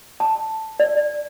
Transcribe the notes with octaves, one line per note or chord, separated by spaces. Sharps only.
A5
D5